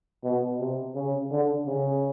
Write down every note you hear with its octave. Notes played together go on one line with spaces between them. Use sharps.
B2
C3
C#3
D3
C#3